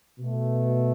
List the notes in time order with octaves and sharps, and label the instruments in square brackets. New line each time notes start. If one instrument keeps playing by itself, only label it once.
[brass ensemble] B2 A3